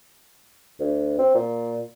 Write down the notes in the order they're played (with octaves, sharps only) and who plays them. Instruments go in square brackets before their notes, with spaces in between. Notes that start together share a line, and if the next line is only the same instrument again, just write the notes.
[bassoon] D2
C4
A#2